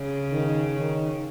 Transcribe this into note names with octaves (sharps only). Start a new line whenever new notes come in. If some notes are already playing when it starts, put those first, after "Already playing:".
Already playing: C#3
D#3
D#3